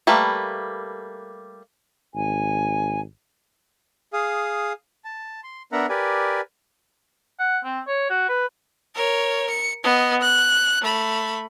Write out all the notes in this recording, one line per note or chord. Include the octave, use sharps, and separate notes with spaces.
G3 A3 A#3 B4
G#1 G#5
G#4 F5 D#6
A5
C6
B3 D4 A#4 E5 F#5 A#5
G4 A#4 B4 D5 G#5
F#5
C4
C#5
F#4
B4
A#4 C#5
C#7
B3 D#5
F#6
A3 B5